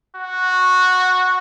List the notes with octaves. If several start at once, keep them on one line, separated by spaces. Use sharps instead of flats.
F#4